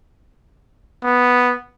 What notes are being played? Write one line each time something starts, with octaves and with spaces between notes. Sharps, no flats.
B3